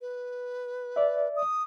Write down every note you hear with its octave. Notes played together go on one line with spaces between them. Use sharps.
B4
D5 E5
D#6